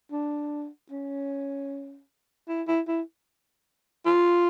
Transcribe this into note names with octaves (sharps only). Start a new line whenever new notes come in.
D4
C#4
E4
E4
E4
F4